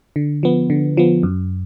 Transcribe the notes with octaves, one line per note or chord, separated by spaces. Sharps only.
D3
F3 B3
D3
F3 B3
F#2